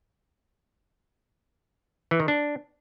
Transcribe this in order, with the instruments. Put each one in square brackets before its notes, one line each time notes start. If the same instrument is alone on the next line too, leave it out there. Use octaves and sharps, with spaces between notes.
[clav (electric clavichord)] E3
D#3
D4